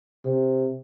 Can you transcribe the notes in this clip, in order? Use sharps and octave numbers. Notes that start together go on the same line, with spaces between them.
C3